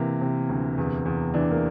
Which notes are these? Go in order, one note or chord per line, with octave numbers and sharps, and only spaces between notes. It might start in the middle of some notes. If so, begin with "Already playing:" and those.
Already playing: C3 E3 A#3
C3
D2
E2
E2
E3 D4
A#3